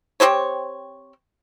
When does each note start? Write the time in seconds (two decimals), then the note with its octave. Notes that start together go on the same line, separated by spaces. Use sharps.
0.20 C4 G4 C5 C#5